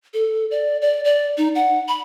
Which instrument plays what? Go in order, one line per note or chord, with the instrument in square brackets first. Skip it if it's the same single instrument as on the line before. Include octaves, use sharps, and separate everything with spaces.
[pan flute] A4
D5
D5
D5
D#4
F#5
B5